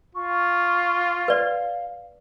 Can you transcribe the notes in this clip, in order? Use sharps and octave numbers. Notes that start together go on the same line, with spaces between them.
F4 C#6
B4 D5 F5